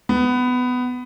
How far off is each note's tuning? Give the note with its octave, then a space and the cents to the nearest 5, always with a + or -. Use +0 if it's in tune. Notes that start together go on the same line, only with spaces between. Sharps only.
B3 +15